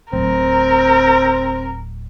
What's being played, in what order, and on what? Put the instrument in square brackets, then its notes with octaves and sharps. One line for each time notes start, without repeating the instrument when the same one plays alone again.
[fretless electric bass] D1 [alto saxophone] C4 [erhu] A#4